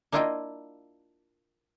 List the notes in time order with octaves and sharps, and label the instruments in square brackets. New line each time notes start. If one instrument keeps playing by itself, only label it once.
[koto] A#3 D4 E4 F4 D#5 G5